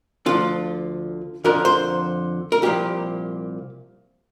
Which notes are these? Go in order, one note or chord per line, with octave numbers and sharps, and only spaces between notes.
D2 D3 F3 F4
F2 D3 F3 A#4
C5
A#4
C2 A#2 F3 G4